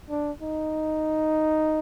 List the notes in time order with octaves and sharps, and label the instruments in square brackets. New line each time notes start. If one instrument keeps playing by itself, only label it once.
[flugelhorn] D4
D#4